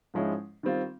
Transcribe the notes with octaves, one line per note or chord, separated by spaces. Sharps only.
G#2 F3 G#3 C#4 E4
D#3 G3 C4 F4